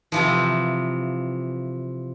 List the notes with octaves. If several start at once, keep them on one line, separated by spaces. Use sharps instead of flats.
C3 E3 F3